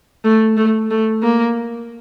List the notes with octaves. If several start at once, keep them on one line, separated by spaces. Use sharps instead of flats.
A3
A3
A3
A#3